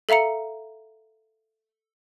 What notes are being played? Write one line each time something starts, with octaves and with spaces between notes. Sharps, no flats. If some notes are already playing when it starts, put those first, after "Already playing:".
A4 E5 F5 A#5 C#7